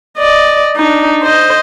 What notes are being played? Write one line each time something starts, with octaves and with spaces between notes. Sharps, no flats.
D5 D#5
D4 D#4
C5 D#5